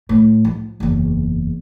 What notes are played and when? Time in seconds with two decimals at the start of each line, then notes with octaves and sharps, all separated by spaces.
0.09 A2
0.45 F3
0.80 F#1 E2